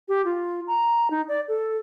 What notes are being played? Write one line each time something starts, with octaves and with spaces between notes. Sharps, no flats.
G4
F4
A#5
D#4
D5
A4